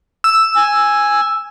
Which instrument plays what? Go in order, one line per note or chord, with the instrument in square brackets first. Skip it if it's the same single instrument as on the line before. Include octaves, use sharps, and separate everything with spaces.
[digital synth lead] E6
[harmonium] G#5